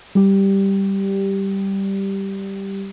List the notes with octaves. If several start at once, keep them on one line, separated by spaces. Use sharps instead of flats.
G3 G4